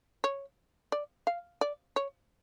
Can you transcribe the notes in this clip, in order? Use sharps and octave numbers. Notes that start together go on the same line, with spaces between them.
C#5
D5
F5
D5
C#5